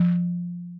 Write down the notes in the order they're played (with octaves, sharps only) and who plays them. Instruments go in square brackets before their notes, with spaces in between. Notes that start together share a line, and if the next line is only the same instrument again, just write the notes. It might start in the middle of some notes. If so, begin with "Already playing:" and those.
Already playing: [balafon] F3